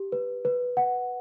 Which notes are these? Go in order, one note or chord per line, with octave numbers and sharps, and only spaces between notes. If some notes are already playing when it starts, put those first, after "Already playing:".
Already playing: G4
B4
B4
F#5